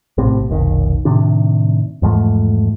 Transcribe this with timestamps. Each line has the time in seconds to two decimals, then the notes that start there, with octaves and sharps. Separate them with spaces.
0.18 A#1 A2 C3 C4
0.50 F1 B1 D#3
1.05 A2 C3 D#3 D4
2.02 E2 G#2 F3 A3